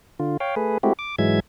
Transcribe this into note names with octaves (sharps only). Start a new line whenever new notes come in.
D3 F4
C#5 F5 G5
A3 G#4 B4
G#3 A3 C4 E4 F#4 G4
D6
G#2 E3 F#3 G#3 E5 G#6